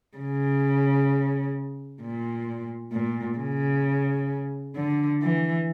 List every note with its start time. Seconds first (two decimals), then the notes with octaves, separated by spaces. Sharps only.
0.17 C#3
2.02 A#2
2.93 A#2
3.38 C#3
4.76 D3
5.22 E3